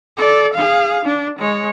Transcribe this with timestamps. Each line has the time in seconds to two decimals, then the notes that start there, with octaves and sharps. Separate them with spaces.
0.17 A4 D5
0.54 G#4 F5
1.05 D4
1.39 G#3 C#5